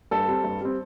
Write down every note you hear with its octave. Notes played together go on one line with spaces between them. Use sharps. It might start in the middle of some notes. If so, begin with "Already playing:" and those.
G2 A4
G3 C4
G2
G3 C4